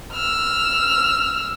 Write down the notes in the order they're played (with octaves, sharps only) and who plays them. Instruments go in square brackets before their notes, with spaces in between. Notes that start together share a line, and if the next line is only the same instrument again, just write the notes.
[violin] E6 F6